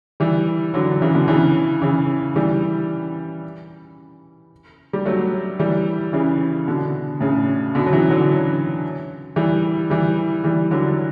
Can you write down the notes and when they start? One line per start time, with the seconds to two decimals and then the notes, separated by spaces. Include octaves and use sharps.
0.20 E3 G3
0.74 D3 F#3
1.01 C#3 E3
1.14 B2 D3
1.28 C#3 E3
1.82 C#3 E3
2.36 E3 G3
4.93 G3
5.06 F#3 A3
5.59 E3 G3
6.13 C#3 E3
6.67 B2 D3
7.21 A2 C#3
7.75 B2 D3
7.86 F#3
7.92 C#3 E3
8.10 D3 F#3
9.36 E3 G3
9.90 E3 G3
10.44 E3 G3
10.71 D3 F#3